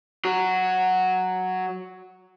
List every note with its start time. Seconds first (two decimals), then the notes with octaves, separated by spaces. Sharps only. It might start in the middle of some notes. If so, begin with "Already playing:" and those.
0.25 F#3 F#4